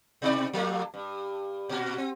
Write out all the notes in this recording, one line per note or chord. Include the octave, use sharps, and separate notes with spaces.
B2 D#4 D5
F3 A3 A#3
G2
A#2 F#4
C4